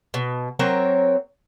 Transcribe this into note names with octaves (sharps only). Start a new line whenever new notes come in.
B2
F#3 C4 A#4 C#5